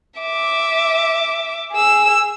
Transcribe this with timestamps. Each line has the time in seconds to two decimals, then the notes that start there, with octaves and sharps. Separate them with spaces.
0.20 E5 D6
1.72 G#4 E6